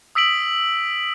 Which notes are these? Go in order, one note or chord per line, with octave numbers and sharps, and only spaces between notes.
D#6 E6 B6 D7 F#7